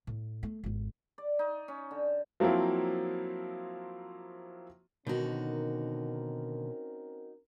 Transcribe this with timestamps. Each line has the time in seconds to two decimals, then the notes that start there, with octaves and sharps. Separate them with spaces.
0.07 A2
0.43 A3
0.64 G#1 F2
1.18 D5
1.39 D#4
1.68 C#4
1.91 D3
2.40 F3 F#3 A#3 C4 E4
5.07 B2 D3 D#3 C4 C#4 D#4 F#4 A#4